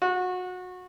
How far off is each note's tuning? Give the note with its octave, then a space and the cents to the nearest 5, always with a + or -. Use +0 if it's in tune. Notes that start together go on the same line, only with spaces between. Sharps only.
F#4 -25